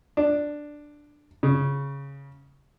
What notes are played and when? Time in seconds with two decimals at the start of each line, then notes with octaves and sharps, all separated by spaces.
0.17 D4
1.43 C#3